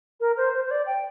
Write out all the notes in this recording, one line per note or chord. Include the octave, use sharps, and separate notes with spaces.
A#4
C5
C5
C5
D5
G5